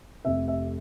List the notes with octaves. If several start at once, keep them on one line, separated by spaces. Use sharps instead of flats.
F1 F2 C3 E5
E5